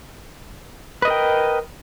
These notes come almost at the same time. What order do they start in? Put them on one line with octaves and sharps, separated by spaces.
B4 D#5 A#4 G5